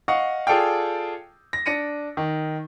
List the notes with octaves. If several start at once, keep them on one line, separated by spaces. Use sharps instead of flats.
D#5 F5 F#5 C#6
F4 G#4 A4 D5 F5 G5
A#6
D4 A#6 C#7 D#7
D#3